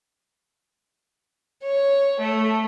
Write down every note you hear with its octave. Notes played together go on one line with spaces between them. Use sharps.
C#5
A3